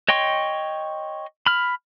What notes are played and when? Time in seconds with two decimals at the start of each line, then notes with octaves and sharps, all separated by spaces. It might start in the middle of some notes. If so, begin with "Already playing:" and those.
0.08 C#5 D#5 G5 C6 C#6
1.46 B5 F6